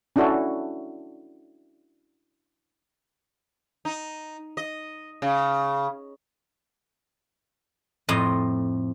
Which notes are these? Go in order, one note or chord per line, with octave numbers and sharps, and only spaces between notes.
C#4 D4 E4 F#4 A4
D#4
D#5
C#3
F2 A2 D#5